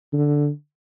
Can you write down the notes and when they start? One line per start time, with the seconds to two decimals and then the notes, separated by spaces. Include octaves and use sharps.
0.13 D3